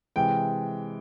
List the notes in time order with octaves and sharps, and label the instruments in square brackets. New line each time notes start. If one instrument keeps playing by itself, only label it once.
[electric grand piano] C3 E3 G#3 [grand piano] G5